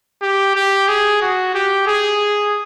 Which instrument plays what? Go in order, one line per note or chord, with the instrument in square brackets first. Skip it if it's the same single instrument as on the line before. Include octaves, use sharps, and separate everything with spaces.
[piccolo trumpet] G4
G4
G#4
F#4
G4
G#4